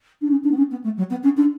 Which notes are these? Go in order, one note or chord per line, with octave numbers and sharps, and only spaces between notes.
D4
C#4
D4
B3
C#4
B3
A3
F#3
B3
C#4
D4